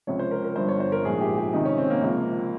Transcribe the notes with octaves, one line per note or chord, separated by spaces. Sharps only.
C#2 C3 F3 C#5
C5
A#4
A#4
G1 G2 F3 C5
C#5
C5
A#4
A#1 G#2 F3 G#4
G4
G4
C#2 C3 D#3 D#4
C#4
C4
A#3
C#2 C3 F3